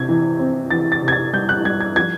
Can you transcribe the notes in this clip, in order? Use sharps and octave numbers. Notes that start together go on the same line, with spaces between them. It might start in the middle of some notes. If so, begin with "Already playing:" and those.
Already playing: C3 G#6
E3
C4
E3 A6
A6
C3
G#6
A6
G3 G6
F#6
G3 G#6
G#6
F3 G#6